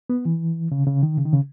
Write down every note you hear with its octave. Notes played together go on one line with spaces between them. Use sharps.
B3
E3
C#3
C#3
D#3
C#3
D#3
C#3